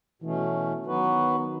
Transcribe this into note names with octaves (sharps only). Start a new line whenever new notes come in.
B2 E3 A3 C#4
D#3 F#3 B3 F#4 B4